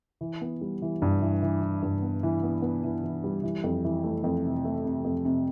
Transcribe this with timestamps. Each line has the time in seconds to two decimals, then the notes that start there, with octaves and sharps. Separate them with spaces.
0.21 E3
0.41 B3
0.61 G3
0.82 E3
1.02 G2
1.21 E3
1.42 E3
1.62 E3
1.83 G2
2.03 B3
2.23 E3
2.43 B3
2.62 B3
2.84 E3
3.04 E3
3.24 G3
3.43 E3
3.64 F2
3.84 E3
4.03 A3
4.24 F2
4.44 C3
4.65 A3
4.85 C3
5.04 F2
5.25 C3